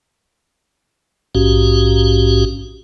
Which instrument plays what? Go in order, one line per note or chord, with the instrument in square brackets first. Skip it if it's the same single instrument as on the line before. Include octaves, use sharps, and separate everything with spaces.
[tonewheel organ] A#1 G#2 C#4 F#4 G4